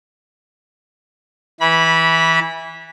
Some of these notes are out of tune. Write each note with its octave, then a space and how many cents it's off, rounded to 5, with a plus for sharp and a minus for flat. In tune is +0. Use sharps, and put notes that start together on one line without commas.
E3 -10 B5 -20